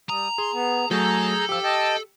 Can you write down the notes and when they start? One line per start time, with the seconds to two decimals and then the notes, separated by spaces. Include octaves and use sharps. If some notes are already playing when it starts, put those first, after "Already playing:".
0.10 G3 A#5 D#6
0.38 G#4 C6
0.54 B3
0.91 F#3 A3 G#4 A4 A#5 G6
1.49 F3 G4 E6
1.64 D#5 G5 A5